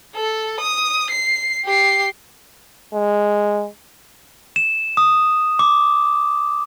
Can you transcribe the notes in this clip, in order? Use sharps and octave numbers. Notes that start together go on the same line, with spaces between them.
A4
D#6
C7
G4 C7
G#3
E7
D#6
D6